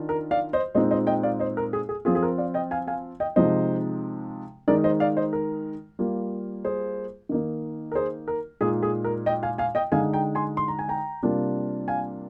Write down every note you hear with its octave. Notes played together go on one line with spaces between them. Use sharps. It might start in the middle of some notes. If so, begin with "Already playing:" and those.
Already playing: D#3 D4 F4
A#4
D5 F5
C5 D#5
A#2 G#3 C4 D#4 C5 D#5
C5 D#5
D#5 G5
D5 F5
C5 D#5
A#4
G#4
G#4
F3 C4 F4 G#4
G#4
A#4
D5 F5
D#5 G5
F5 G#5
F5 G#5
D#5 G5
C3 F3 G#3 D#4 C5 D#5
D#3 G#3 D#4 A#4 D5
C5 D#5
D5 F5
C5 D#5
A#4
G3 A#3 F4
G#4 C5
D#3 A#3 D#4
A#4
G#4 C5
A#4
A#2 G#3 D#4 G#4
G#4
A#4
D#5 G5
F5 G#5
F5 G#5
D#5 G5
D3 G#3 D#4 F5 G#5
G5 A#5
G#5 C6
C6
A#5
G#5
G5 A#5
C3 G3 A#3 D4 F4
F5 G#5